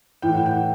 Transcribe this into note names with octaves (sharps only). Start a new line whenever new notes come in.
A2 E3 G5
F#5
G5